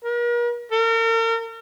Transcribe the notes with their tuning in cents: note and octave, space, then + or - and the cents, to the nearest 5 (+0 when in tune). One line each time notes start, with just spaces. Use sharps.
A#4 +40
A#4 -40